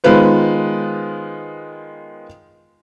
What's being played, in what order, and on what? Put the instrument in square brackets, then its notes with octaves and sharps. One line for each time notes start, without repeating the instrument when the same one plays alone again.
[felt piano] D#3 G#3 B3 F4 B4 C5